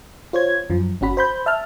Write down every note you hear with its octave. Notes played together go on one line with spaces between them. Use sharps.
F4 C5 C#5 G#6
F#2 F3
G1 C#4 F#4 B5
C5 B5 G6
E5 A5 F6